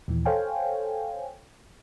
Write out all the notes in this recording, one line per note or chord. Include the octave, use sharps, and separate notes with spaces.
D#2 A#2 E3
A4 C5 C#5 F5 G5 G#5